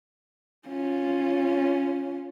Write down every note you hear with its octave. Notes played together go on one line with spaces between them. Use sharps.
C#4 F4